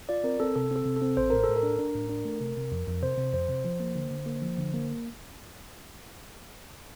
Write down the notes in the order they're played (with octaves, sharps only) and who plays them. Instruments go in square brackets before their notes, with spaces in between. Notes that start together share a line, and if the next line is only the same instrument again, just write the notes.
[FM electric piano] F4 [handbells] D5
[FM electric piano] C4 [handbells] A#4
[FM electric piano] C4 [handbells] A4
[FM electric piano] C3 [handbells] A4
[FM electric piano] C4 [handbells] A4
[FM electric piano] C3
[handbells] A4
[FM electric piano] C4
[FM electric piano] A1 [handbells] C5
[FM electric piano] A2 [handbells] A#4
[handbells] A4
[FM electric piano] A2
[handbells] A#4
[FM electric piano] D4
D4
A2
D4
A3
C3
C3
F2
F2
[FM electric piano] C3 [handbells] C5
[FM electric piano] C3
[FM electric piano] F2 [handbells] C5
[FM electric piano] C3
F3
A#3
D3
D3
A#3
F3
D3
A#3